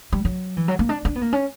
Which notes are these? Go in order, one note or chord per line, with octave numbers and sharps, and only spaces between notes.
G3
F#3
E3
F#3
A#3
D4
D4
B3
A#3
C#4